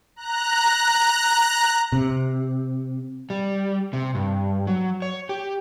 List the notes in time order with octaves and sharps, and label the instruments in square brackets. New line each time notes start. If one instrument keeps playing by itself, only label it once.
[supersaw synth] A#5 F#6
[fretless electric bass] C3
[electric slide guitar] G3
C3
G2
F#3
C#5
G4